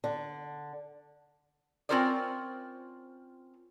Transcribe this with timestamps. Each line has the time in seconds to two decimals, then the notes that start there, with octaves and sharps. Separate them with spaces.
0.04 D3
1.89 C4 C#4 F4 A#4 C5 D5